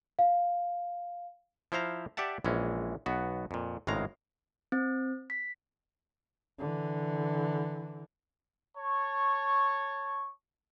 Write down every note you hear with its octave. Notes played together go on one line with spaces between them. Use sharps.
F5
F3 E4 C5 F5 A#5
G4 D5 E5 F#5 A5
A#1 E3 G#3 C#4
B1 B3 F#4
F2 A#2
G#1 A2 C#3 G#3 F5 A#5
C4
B6
D3 E3
C#5 A5 C#6